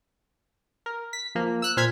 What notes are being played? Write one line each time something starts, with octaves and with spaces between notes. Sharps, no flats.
A#4
B6
F3 A#3
E6 F#6
A#2 C5 F6 G#6 B6